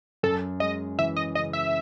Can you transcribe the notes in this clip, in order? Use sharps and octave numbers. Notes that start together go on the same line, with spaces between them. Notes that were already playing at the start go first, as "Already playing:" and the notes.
F#2 A4
G#3 D#5
E3 E5
D#5
C#3 D#5
E5